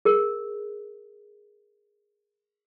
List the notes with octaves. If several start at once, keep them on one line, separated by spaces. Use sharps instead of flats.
G#4 A#4